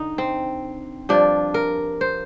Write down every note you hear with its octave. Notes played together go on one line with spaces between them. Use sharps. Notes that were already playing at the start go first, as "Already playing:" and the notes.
Already playing: D3 D#4
C4
G2 F3 D4
A#4
C5